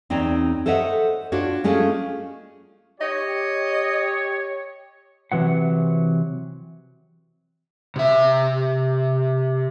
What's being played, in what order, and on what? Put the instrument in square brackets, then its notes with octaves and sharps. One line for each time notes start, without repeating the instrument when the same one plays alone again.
[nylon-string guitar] E2 C4 D#4 C#5 D5
A4 C5 C#5 D#5 E5 F#5
D4 F4 F#4 C#5
G#3 A3 C#4 F4 G#4
[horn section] G4 C#5 [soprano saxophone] D#5
[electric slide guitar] C3 E3 F#3 F#5
[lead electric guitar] C3 E5